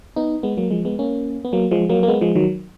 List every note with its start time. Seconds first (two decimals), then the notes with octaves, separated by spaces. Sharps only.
0.16 B3 D#4
0.43 G#3 B3
0.57 F#3 A#3
0.71 F3 G#3
0.85 G#3 B3
0.99 A#3 C#4
1.45 B3
1.53 F#3 A#3
1.71 F3 G#3
1.89 F#3 A#3
2.03 A#3
2.08 G#3 B3
2.21 F3 G#3
2.35 D#3 F#3